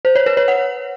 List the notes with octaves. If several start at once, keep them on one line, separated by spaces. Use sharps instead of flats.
C5
C#5
B4
C#5
F#5